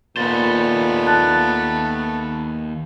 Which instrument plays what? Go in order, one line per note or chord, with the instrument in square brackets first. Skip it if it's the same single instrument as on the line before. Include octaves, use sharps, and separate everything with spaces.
[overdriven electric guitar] D#2 C5 [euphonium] A#2 [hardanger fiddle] A3 B3 [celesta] A6
[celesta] A5 F#6 A6